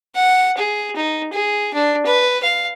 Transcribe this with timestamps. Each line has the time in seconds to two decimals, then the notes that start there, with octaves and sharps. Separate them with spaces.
0.15 F#5
0.57 G#4
0.96 D#4
1.33 G#4
1.74 D4
2.06 B4
2.43 F5